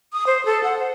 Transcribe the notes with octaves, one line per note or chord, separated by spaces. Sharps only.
D#6
C5
A4
F#5
C5